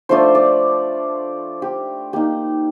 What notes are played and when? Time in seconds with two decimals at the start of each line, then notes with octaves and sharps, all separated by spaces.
0.09 F3 A3 D4 F4 C5
0.35 D5
1.62 G4
2.13 A#3 D#4 G4